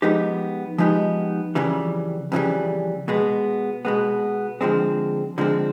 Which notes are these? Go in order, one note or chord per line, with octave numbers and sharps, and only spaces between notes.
F3 G#3 B3 D#4 G4
F3 G#3 B3 D#4 G4
F2 C#3 E3 G3
F2 C#3 E3 G3
B2 G#3 B3
B2 G#3 B3
D3 F3 G#3 C4
D3 F3 G#3 C4